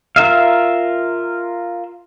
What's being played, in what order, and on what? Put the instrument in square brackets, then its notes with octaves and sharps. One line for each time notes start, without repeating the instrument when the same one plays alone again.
[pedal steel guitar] F4 A#4 E5 F5